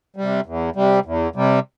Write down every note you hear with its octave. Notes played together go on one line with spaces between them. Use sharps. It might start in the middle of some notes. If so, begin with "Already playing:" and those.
C3 G3
E2
C3 G3
E2
C3 G3